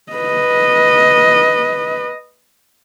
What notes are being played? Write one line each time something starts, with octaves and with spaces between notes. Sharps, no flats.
B4 D#5